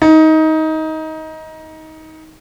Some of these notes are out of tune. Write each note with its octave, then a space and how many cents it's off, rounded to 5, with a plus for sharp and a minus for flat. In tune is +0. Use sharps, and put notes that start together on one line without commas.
D#4 +20